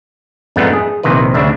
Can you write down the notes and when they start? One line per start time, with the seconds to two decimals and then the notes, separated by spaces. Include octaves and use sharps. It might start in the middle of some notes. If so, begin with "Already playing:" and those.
0.56 F2 G#2 A3 B3 D4 D#4
0.73 G#4
1.03 A#1 C3 D#3 E4 B4
1.34 D2 C#3 D4 E5